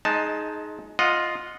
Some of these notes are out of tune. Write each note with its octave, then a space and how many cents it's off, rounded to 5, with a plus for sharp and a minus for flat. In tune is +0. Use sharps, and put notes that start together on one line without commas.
G#3 +20 D#4 +0 A5 +0
F4 +0 D#5 +0 F#5 -20